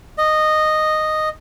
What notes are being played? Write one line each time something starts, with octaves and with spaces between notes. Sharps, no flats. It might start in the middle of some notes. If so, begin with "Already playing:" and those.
D#5